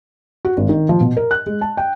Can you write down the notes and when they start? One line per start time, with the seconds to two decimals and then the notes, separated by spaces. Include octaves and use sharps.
0.45 F#4
0.57 G#1
0.69 D#3
0.89 F3
1.00 B2
1.17 A#4
1.31 F#6
1.46 G#3
1.61 A5
1.77 G5